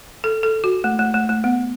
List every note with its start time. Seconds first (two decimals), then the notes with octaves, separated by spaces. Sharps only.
0.24 A4
0.43 A4
0.64 F#4
0.84 A3
0.99 A3
1.14 A3
1.29 A3
1.44 B3